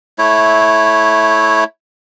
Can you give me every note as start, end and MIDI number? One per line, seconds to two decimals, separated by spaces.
0.19 1.64 57
0.19 1.64 64
0.19 1.64 73